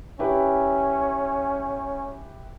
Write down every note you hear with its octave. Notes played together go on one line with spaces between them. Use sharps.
C#4 E4 G4 B4